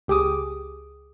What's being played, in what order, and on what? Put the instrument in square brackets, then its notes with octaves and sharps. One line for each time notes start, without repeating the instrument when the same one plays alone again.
[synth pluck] C#2 G4 G#4 D6 D#6